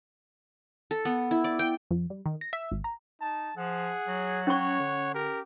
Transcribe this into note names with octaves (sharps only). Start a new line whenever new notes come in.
A4
B3
E4
D5
G5
F2
G3
D#3
A#6
E5
G#1
A#5
D#4 A5
F3 G#4 F#5
F#3
C#4 C#5 C#6
D3
G4 A#4